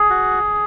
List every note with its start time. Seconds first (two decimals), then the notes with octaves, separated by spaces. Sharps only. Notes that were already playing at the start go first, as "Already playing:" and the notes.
Already playing: G#4
0.10 F#4